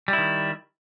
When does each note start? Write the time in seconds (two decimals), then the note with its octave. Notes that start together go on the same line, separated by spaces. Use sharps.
0.08 G3
0.13 E4
0.18 D#3